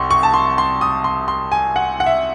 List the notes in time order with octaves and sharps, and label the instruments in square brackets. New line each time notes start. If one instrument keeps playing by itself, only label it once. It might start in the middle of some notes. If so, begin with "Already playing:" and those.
Already playing: [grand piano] C2 C3 F#5 C6 C#6
C#6
A5
C6
C6
D#6
C6
C6
G#5
F#5
F#5
E5